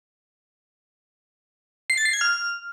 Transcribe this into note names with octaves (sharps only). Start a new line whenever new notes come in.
C7
A6
C7
G#6
F6